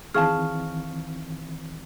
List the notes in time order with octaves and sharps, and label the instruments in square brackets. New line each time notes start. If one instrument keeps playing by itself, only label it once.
[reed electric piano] D#3 E3 C4 [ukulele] G#4 A5 [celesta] F5 C#6 F6